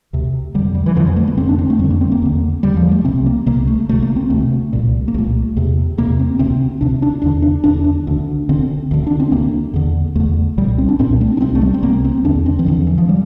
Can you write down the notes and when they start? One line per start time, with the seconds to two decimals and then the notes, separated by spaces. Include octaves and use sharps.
0.13 D2 C3
0.55 F2 D3 G3
0.75 G3
0.86 E3
0.96 F2 D3 F3
1.07 G3
1.16 A3
1.27 A#3
1.37 F2 D3 C4
1.49 D4
1.58 C4
1.70 A3
1.79 F2 G3
1.84 D3
1.91 A#3
2.01 C4
2.12 A#3
2.22 E2 D3
2.63 E2 D3 G3
2.77 F3
2.91 A3
3.05 C2 C3 C4
3.26 A#3
3.46 C2 C3 A#3
3.67 A3
3.89 D2 C3 A3
4.02 A#3
4.16 C4
4.30 D2 C3 A3
4.73 C2 A#2
5.08 A#3
5.14 C2 A#2 A3
5.57 E2 C3
5.98 E2 C3 A#3
6.19 C4
6.39 D2 C3 C4
6.81 D2 C3 D4
7.02 D4
7.22 E2 D3 D4
7.42 D4
7.64 E2 D3 D4
7.84 D4
8.07 D2 D3
8.49 D2 D3 C4
8.91 D2 D3
9.07 D4
9.20 C4
9.32 D2 D3 A#3
9.74 E2 D3
10.16 E2 D3 A3
10.58 C2 A#2 G3
10.78 C4
10.89 D4
10.99 C2 A#2 C4
11.21 A3
11.37 D4
11.41 C2 C3 C4
11.55 A3
11.61 G3
11.74 C4
11.82 C2 C3 A#3
12.04 C4
12.25 E2 D3 D4
12.46 C4
12.59 E3
12.66 E2 D3 F3
12.87 E3
12.98 F3
13.09 G3